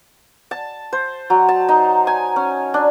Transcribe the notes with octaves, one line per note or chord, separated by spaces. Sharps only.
A5
C5
F#3
A5
D#4
G#5
C#4
D4